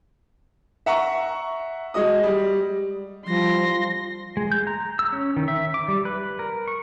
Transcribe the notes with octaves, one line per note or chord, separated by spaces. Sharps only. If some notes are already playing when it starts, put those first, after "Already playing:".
E5 F#5 A#5 C#6
G#3 F#4 D#5 D#6
G3
F3 G3 C6 A#6
G#3
G6
A#5
E6
C#4
D#3
E5
D6
G3
B4
A#4
C#6